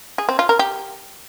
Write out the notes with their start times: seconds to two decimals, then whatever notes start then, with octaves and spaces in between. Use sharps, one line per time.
0.18 G#4
0.29 C4
0.39 F4
0.49 A#4
0.59 G4